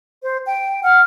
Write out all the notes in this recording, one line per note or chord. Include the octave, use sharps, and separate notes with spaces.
C5
G5
F#5 F6